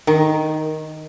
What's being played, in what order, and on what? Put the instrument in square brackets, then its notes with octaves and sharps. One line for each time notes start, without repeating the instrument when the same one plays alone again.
[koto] D#3